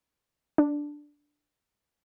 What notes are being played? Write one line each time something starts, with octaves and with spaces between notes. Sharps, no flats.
D4